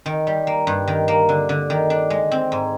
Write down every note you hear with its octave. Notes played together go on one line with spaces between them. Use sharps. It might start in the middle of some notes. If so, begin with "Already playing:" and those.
D#3
G3
A#3
G2
D#3
A#3
D3
D3
D#3
D4
G#3
C4
G#2